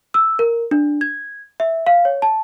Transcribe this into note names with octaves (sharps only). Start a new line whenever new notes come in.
E6
A#4
D4
G#6
E5
F5
C#5
A5